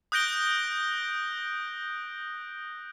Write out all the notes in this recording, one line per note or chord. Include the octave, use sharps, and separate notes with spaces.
D#6 F#6 G6 A#6 D7 G7